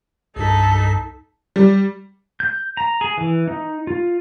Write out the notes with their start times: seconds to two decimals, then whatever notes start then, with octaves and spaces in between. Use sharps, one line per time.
0.36 C2 G2 D#4 A4 B6
1.56 G3
2.40 G6
2.77 A#5
3.01 G#4
3.18 E3
3.48 D#4
3.87 F4